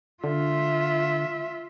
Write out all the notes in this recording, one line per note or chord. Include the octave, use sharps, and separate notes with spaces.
D3 F4 E5